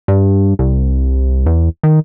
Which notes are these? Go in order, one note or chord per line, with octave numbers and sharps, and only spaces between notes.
G2
C2
E2
D#3